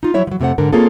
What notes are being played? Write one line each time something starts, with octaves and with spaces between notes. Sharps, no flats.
D#4 F4
F3 F#3 E4 C#5 E5
F3 F#3
F2 C3 A3 C5 F#5
G#2 D3 A#4
A#3 C4 C#4 F4 G#4 A4